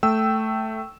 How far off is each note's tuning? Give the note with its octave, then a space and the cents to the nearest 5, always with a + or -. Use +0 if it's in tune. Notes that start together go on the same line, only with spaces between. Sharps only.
A3 +0 G5 -15 E6 +0